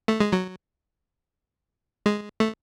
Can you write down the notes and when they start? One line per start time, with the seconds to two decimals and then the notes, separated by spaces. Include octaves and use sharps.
0.08 A3
0.20 G#3
0.32 F#3
2.06 G#3
2.40 A3